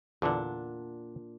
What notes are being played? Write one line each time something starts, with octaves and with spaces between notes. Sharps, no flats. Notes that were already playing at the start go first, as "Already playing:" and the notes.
E2 A#2 D3 D4 F#5